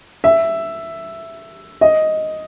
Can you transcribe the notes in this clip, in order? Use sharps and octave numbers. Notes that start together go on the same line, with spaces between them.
E5
D#5